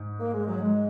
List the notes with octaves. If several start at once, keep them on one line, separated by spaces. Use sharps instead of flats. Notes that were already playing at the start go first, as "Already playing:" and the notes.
Already playing: G#2
A#3
G#3
F#3
G#3